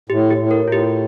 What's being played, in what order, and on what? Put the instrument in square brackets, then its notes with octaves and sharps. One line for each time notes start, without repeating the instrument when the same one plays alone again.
[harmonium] A2 [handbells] G4
[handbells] G4
[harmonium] A2
[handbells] A#4
[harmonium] A2 [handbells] F4
[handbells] G4